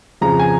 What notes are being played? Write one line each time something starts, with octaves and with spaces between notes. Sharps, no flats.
F2 C#3 F3 A#5
G#5